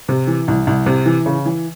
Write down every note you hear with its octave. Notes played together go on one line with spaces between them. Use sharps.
C3
E3
C2
C2
C3
E3
C#3
E3